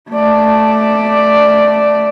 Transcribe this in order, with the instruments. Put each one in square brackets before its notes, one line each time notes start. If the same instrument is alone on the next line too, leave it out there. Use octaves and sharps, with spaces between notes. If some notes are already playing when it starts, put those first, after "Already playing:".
[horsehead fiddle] A3 D5